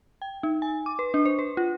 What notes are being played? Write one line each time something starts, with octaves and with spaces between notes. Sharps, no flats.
G5
D#4
G#5
D6
B4
D4
C5
B4
F4